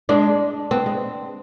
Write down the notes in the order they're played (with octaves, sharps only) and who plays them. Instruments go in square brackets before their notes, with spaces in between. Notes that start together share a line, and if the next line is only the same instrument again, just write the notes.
[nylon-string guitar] G#3 [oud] D4
[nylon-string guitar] B3 [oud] C4
[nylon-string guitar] G#3